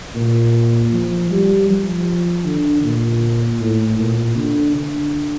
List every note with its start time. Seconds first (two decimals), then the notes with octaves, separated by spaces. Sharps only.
0.15 A#2
0.93 F3
1.31 G3
1.69 F3
2.45 D3
2.84 A#2
3.60 A2
3.99 A#2
4.36 D3
4.75 D3